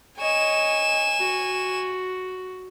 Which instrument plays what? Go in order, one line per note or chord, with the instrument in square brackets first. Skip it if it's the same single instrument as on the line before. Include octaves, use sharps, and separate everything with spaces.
[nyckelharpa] C#5 D#5 [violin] G#5 E7
[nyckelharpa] F#4